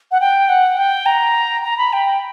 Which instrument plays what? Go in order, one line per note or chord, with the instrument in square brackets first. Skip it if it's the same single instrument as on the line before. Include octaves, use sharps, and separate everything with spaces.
[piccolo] F#5
G5
F#5
G5
A#5
A#5
B5
G5